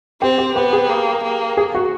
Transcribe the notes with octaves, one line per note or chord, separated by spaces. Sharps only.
C4 G4
G4
B3 G4
G#4
A#3
A#3
G#4
F#4